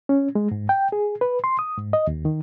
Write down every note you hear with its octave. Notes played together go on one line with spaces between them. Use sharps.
C#4
G#3
G#2
G5
G#4
B4
C6
D#6
G#2
D#5
D#2
D#3